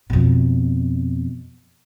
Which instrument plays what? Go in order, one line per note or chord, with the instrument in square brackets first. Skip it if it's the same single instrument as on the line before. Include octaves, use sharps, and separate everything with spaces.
[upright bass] F2 B2